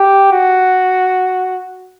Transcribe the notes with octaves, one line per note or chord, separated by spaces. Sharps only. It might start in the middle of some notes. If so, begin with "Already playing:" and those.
Already playing: G4
F#4